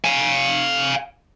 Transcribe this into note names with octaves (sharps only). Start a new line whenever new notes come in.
F5 G#5